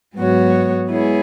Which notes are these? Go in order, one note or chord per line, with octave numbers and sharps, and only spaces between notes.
G#2 F#3 B3 F#4 C#5
G#3 B3 E4 G#4 C#5